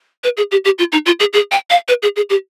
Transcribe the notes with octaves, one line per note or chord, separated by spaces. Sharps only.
B4
G#4
G4
G4
F4
D#4
F4
G#4
G#4
G5
F5
B4
G#4
G#4
G4